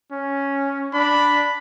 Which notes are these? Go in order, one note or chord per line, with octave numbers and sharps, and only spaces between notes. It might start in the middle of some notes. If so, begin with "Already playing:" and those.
C#4
D4 B5